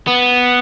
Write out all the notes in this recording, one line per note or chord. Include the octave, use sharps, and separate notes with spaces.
B3